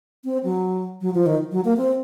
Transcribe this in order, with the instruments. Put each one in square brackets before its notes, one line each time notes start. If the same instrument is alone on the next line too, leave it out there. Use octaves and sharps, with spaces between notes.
[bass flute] C4
F#3
F#3
F3
D#3
F#3
A#3
C4